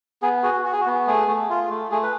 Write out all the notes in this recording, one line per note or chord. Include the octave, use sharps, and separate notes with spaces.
B3 G#4
F#4 G#4
F#4
G#4
F#4
B3
A3 G#4
A3
F4
A3
A3 G#4
B4